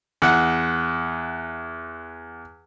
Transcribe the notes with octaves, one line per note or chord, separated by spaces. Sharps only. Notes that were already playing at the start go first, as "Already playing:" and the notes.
E2 F#5